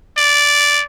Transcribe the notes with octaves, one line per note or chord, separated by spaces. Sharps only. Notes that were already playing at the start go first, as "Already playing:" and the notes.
D5